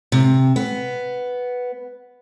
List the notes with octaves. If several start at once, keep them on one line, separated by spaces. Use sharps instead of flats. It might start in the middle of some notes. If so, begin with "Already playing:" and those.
C3
B3